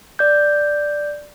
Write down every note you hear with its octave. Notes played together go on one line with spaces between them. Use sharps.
D5 G6